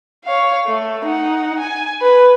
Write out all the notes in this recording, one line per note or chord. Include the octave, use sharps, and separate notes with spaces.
C#5 F5
A3
D#4 F#5
G#5
B4